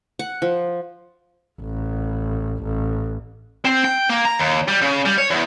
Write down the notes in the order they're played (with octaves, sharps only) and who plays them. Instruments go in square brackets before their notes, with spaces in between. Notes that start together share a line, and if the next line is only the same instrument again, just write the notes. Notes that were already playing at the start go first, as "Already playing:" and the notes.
[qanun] F#5
F3
[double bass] A1
A1
[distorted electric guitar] C4
G5
A#3
A#5
D#2
G3
C#3
G3
C#5
E2